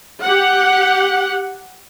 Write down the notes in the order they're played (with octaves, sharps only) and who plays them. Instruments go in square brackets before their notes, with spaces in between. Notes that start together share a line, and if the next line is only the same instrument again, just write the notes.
[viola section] G4 F#5